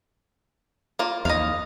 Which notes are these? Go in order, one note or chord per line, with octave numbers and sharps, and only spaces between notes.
A#3 F4
D#2 D#5 F5